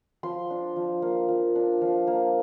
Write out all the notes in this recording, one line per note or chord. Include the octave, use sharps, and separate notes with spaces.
F3 C6
D4
F3
A#3
F3
D4
F3
A#3